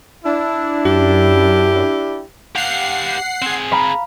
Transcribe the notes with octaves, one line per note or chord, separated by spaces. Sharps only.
D4 E4
F#2 G4
G4 F5 F#5 C7
C4 G#4
F5 A#5 B5